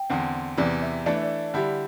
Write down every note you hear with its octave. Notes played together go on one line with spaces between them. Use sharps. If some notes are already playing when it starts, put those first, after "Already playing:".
Already playing: G5
E2 D3 C4
E2 C3 E3 D5
E5
E3 A3 D4 D5
E5
D5
D3 G3 E4 G4